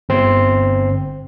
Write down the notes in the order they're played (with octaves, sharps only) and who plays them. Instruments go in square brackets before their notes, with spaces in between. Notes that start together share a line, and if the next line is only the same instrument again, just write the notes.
[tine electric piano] G1 C4 C6